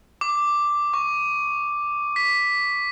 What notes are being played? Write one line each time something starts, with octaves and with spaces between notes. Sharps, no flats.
D6
C#6
B6